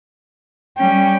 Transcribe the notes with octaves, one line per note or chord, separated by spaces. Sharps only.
G3 C#4 G5